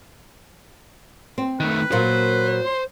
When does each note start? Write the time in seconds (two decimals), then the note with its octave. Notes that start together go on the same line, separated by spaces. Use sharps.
1.38 C4
1.60 D#3 A3 B4
1.92 A#2 F#3 A#3 C5
2.65 C6